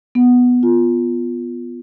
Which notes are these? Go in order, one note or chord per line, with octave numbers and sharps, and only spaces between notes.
B3
F4